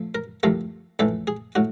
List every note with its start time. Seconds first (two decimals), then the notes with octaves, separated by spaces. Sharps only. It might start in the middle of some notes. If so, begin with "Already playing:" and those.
Already playing: F3 A3
0.15 A#4
0.43 C2 C3 F3 A3 A#4
0.99 A#1 A2 E3 A4
1.27 G#4
1.55 A2 F#4